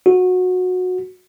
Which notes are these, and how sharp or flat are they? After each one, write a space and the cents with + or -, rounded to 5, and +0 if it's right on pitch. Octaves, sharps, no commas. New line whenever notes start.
F#4 -20